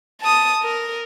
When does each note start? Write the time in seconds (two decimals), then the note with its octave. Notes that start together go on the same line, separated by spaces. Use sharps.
0.22 A5 D#6
0.63 A#4